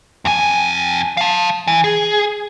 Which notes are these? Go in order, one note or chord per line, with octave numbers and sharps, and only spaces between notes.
F2 G#5
F5 A5
E3
G#4